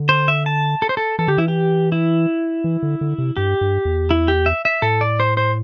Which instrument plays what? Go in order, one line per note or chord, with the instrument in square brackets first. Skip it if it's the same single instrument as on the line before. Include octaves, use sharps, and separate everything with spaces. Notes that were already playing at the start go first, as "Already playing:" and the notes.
Already playing: [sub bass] D3
[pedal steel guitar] C5
E5
A5
A4
C5
A4
[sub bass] E3 [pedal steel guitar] A4
[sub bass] D3 [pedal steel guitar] G4
[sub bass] E3 [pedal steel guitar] E4
[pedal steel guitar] G4
E4
[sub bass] E3
D3
D3
C3
[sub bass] G2 [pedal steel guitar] G4
[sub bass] G2
E2
[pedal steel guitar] E4
G4
E5
E5
[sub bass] A2 [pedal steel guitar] A4
[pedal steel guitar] D5
C5
C5